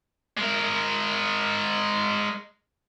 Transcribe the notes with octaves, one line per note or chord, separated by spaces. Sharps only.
G#3 A#4